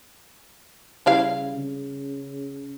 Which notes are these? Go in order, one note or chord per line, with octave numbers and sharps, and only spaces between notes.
C#3 G3 E4 F5
C#3